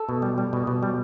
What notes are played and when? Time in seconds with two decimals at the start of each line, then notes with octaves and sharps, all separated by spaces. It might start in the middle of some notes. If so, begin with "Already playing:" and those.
Already playing: A4
0.09 B2
0.22 G3
0.38 G3
0.53 B2
0.67 B2
0.83 G3